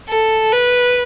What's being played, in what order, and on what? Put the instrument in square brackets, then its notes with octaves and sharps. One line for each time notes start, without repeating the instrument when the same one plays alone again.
[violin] A4
B4